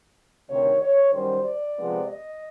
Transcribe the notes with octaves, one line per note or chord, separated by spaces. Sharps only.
D2 C3 D#3 C#5
C#5
F#2 D#3 G3 C5
D5
C3 F3 G#3 B3
D#5